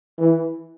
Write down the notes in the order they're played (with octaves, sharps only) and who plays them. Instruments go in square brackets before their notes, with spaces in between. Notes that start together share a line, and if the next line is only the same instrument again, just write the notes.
[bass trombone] E3